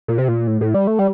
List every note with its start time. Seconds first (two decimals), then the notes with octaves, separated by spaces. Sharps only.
0.08 A#2
0.18 C3
0.28 A#2
0.47 A2
0.61 A2
0.74 G3
0.87 A3
0.99 G3